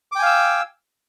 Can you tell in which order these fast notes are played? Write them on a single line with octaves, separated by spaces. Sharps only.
D6 G5 G#5 F5 E6